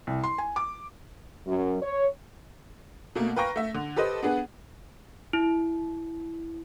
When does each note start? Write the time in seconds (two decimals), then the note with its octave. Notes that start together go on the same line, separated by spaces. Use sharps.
0.07 C2
0.24 C6
0.38 G#5
0.56 D6
1.47 F#2
1.82 C#5
3.15 B2 A3 A#3
3.36 B4 F5 G5 A#5 C#6 A#6
3.56 A3 E5
3.74 D3
3.96 G4 A4 B4 C5 D#5
4.23 B3 D4 G#4 B4
5.33 E4